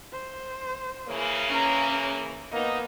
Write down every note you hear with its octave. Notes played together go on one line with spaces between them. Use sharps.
C5
C#3 E3 A#3
C#4 A#5
A#3 B3 D#4